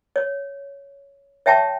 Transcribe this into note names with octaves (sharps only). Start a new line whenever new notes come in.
C#5
C#5 E5 G5 A5 C#6